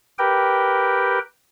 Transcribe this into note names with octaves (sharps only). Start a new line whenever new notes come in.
G4 A#4 B4 G5